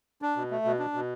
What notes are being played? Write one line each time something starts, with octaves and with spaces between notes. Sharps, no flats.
D4
B2
A3
B2
D4
B2